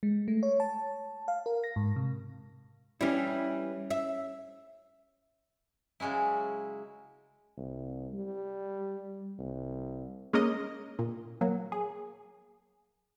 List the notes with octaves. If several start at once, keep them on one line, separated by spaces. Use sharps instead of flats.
G#3
A3
C#5
A5
F5
A#4
A#6
G#2
C3
E3 G3 C#4 E4
E5
C#3 F#3 G#3 C#4 E4
C2
G3
C2
G#3 A#3 C#4 A#4 D#5
A#2
F#3 A#3
G#4